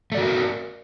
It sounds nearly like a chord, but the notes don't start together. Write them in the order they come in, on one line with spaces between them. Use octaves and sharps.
A3 D5 F#4 A#4